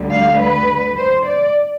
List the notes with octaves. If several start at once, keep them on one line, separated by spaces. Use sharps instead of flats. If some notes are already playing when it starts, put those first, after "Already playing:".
Already playing: D2 D3 G3
F5
B4
C5
D5